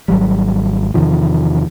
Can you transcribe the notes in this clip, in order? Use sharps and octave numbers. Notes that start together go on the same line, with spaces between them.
G#1 F#3 G3
E2 C3 D#3 F3